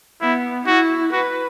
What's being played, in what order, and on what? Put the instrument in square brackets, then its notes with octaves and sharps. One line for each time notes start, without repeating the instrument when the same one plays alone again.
[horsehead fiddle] B3 [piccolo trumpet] E4
[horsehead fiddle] E4 [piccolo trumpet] F#4
[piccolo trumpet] F#4 [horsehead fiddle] B4